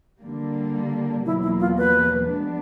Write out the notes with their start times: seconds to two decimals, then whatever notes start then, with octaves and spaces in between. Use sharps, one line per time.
0.22 D3 G3 A#3
1.25 E2 B2 F#3 A#3 E4
1.42 E4
1.60 F4
1.78 B4
2.29 F3 G#3 B3 D4